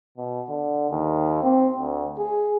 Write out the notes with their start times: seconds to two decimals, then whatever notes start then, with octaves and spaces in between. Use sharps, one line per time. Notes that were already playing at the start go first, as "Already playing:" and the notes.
0.18 B2
0.49 D3
0.91 D#2
1.43 C4
1.76 D2
2.19 G#4